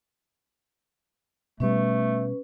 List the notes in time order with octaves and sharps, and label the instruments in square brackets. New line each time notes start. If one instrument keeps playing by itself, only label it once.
[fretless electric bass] B2 G3 [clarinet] A3 [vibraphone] C#4 B4